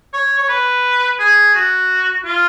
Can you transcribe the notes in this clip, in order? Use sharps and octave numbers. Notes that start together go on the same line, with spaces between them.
C#5
C#5
B4
G#4
F#4
F4